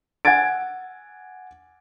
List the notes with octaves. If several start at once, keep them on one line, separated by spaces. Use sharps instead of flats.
F#5 G#5 G#6 A6 D7